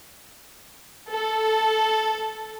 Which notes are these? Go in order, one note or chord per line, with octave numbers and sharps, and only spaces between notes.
A4